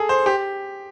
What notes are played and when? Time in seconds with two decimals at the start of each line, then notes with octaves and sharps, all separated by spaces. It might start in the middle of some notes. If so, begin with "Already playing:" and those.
Already playing: G#4 A4
0.09 C5
0.26 G4